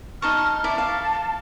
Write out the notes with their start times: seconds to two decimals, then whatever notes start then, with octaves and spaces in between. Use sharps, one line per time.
0.22 D#4 A5 C#6 F6
0.64 E4 D5 A5
0.78 F5